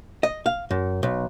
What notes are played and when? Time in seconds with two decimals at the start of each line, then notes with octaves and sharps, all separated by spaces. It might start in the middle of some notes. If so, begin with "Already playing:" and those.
0.23 D#5
0.46 F5
0.71 F#2
1.03 B1